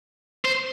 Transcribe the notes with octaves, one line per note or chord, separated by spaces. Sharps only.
C5